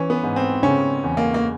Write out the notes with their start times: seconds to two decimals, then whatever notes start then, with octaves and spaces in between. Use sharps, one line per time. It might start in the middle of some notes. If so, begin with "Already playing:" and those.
Already playing: E3 C#4
0.10 B3
0.23 G#2
0.36 C4
0.63 C#3 C#4
1.03 E2
1.17 A#3
1.34 A#3